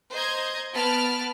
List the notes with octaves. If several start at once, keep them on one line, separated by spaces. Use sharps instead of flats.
C5 D#5 A#5 G6 G#6
B3 A5 B5 F6 D7